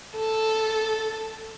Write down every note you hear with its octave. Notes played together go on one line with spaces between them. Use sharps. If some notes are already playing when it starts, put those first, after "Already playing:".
A4